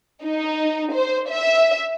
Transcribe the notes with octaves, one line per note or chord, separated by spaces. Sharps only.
D#4
C5
E5